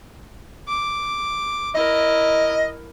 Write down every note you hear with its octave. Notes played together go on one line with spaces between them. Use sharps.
D6
E4 A#4 D#5